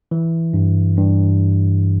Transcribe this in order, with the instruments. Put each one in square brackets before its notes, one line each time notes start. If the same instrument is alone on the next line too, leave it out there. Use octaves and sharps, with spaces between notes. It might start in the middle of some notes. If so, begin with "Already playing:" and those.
[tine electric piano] E3
G2
G2